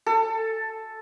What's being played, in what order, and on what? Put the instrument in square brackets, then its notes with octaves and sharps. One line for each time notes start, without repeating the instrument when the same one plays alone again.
[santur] A4